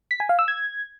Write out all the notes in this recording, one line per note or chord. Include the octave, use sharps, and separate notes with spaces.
B6
G#5
F5
E6
G#6